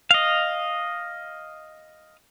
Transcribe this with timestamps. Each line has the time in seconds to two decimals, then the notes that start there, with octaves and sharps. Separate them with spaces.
0.11 D#5 F5